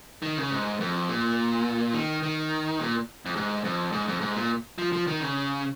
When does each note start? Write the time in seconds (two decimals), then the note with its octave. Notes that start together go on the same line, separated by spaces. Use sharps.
0.23 D#3
0.37 C#3
0.51 G#2
0.80 F2
1.08 A#2
1.94 D#3
2.23 D#3
2.80 A#2
3.26 F2
3.36 G#2
3.64 F2
3.92 G#2
4.08 F2
4.21 G#2
4.35 A#2
4.78 F3
4.93 F3
5.07 D#3
5.20 C#3